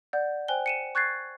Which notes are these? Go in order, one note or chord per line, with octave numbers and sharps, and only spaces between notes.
D5 F#5 G6
C5 G5 G#5 F#6 G7
C#7 D#7 E7
C#6 F#6 G#6 A6 C7